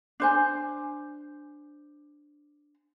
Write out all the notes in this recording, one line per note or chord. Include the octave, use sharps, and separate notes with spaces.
D4 C5 G#5